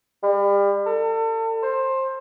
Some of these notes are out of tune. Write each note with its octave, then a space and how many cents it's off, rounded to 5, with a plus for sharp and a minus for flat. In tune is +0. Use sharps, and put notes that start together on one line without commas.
G3 +35
A4 +35
C5 +20